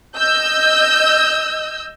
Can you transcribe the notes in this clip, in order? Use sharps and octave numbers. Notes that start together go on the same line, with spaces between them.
D#5 E6 G6